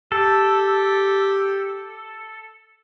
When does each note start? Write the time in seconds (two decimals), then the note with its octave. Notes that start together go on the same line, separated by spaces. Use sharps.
0.12 G4 A4